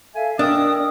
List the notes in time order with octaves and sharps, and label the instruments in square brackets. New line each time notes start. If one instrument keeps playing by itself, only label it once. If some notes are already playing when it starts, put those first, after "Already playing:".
[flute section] A4 E5 F5 [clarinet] G#5
[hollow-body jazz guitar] D4 [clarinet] A#4 [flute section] D#5 G5 E6 [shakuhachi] D#6